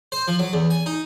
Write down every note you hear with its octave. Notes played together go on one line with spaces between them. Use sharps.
C5
F3
F#3
E2
G#5
D#4